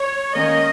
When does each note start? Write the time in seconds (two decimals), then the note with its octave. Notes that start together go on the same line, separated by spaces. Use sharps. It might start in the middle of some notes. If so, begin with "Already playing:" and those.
Already playing: C#5
0.34 D#3 A#3 C#4 D#5